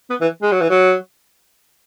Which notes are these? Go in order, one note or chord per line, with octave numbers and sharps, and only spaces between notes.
B3
E3
G#3
F#3
E3
F#3